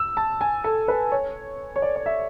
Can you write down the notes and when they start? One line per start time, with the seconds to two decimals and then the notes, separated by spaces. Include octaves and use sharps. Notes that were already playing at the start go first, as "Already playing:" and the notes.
Already playing: E6
0.17 A5
0.41 G#5
0.64 A4
0.88 B4
1.12 C#5
1.76 C#5
1.82 D5
1.96 D5
2.06 E5